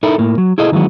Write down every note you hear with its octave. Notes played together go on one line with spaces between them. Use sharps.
D#4 E4 A4 A#4
A2 A#3
F#3
E4 G#4 A4 D#5
D#3 E3 F#3 G#3 B3